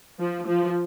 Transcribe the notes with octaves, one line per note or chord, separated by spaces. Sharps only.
F3
F3